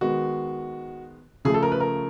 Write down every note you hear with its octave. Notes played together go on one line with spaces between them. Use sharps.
D#3 G#3 B3 F#4
C#3 F3 A3 G#4
A4
A#4
B4
A#4